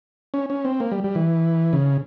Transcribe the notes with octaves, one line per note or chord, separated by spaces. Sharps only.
C#4
C#4
C4
A#3
G3
G3
E3
C#3